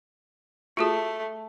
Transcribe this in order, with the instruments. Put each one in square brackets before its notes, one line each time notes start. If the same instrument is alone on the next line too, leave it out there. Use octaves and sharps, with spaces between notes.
[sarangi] A3 [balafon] F4 F#4 G#4